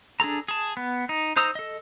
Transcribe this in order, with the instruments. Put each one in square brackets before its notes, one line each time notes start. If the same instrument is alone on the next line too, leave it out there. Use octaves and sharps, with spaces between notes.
[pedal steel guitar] D4 G#4 A4 A#5
G#4 A5
B3
D#4
D#4 C5 A#5 D#6 E6
A4 D#5